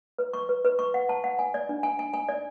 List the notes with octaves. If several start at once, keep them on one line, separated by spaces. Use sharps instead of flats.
B4
C#6
B4
B4
C#6
F#5
A5
F#5
G#5
D5
D4
G#5
G#5
G#5
D5